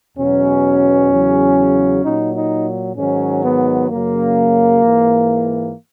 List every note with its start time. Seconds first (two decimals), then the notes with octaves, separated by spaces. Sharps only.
0.18 E2 B2 F#3 C#4
1.10 E2 C#3 F#3
2.03 A#2 F#3 D#4
2.34 D#4
2.96 G#2 D#3 F#3 C#4
3.43 B3
3.89 F#2 C#3 F#3 A#3
4.82 G#2 E3